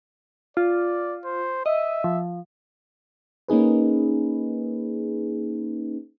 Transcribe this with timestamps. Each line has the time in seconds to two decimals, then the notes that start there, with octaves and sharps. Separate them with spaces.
0.57 F4 D5
1.25 C5
1.66 D#5 E5
2.04 F3
3.48 A#3 C#4 D#4 G#4 B4